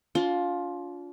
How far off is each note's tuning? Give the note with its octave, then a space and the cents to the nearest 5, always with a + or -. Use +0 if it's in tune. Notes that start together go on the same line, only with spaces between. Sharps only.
D4 -40 F4 +15